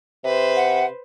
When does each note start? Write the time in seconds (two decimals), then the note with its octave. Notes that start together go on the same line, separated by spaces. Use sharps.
0.24 C3 B4 C5
0.56 F#5